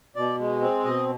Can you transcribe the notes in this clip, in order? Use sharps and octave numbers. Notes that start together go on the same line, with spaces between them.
B2 D5
G#3
C4
B2 D#5